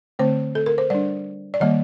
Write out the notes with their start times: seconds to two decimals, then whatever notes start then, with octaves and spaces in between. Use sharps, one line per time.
0.19 D3 A3 C4 C5
0.55 A4
0.66 A#4
0.78 C5
0.90 G3 D4 D5
1.54 D5
1.60 D#3 G3 A#3 D#5